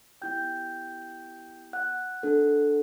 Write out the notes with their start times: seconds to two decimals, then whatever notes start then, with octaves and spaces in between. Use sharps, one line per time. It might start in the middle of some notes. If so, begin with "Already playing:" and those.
0.22 B3 E4 G4 G5 G6
1.73 F#5 F#6
2.23 D4 A4